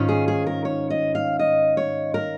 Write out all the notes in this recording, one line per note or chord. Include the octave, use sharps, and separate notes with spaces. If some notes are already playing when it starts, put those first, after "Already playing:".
Already playing: G#2 D#3 C#4 F4
G#4
G#4
A#4
C#5
D#5
F5
D#5
C#5
A#4